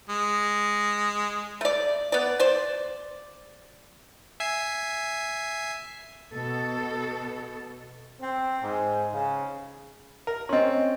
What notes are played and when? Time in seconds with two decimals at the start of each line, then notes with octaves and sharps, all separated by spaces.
0.09 G#3
1.61 A3 D5
2.12 B3 D5
2.40 C5 D5
4.40 E5 G#5 C7
6.32 B2 A4
8.22 C4
8.62 G#2
9.13 C#3
10.27 A#4
10.49 C4 C#4 D#5 C6